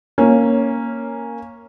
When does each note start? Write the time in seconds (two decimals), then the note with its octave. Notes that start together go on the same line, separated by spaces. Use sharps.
0.18 A#3 C#4